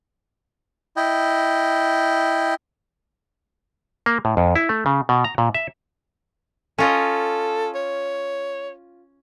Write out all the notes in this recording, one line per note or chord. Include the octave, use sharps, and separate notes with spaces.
E4 D#5 G5
A#3
A2
F2
E4
A3
C#3
B2
A#5
A#2
E5
C#4 F4 A4 D#5
C#5